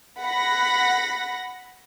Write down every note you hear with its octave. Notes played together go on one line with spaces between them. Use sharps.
F#5 B5 A#6